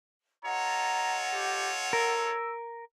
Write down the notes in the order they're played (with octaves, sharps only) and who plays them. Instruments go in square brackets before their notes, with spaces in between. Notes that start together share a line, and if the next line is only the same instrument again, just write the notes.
[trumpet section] F4 A4 C#5 [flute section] D#5 F#5 [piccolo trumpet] A#5
[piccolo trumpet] G4
[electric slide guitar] A#4 [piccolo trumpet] E6